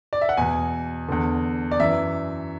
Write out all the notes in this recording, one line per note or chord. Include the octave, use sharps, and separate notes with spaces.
D5
E5
F#5
E2 B2 G#5
E2 D3
D5
F#2 E3 E5